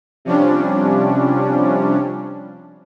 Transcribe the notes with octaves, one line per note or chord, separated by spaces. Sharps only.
C3 F3 G3 C#4 D4